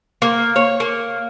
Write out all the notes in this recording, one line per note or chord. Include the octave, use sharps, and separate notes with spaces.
A#3
C#5
A#3